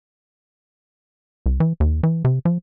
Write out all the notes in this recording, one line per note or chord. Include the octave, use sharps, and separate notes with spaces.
C2
E3
D#2
E3
C3
F3